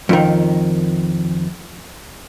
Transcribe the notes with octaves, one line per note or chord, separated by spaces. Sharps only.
F2 D#3